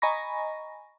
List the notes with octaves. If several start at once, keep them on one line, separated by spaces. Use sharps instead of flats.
D#5 G#5 A#5 B5 C#6 A#6